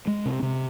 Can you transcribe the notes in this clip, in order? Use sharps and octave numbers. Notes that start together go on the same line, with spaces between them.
G#3
C3
C3